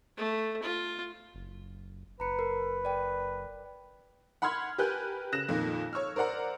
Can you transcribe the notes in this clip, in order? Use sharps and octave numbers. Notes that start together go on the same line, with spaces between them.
A3
F4
F#1
F#1 B4 A#5 C#7
A#4
A#4 D5 G5
F#5 B5 C6 F6 G#6
G4 A#4 B4 G#5 F#6 G6
C#3 F#6 A#6 E7
F2 A#2 D#3 A#3
C#5 C#6 E6 F6
A#4 C5 D5 F#5 A#5